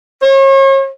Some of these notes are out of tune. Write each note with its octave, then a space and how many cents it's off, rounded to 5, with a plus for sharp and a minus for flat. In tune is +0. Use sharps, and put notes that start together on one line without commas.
C#5 -40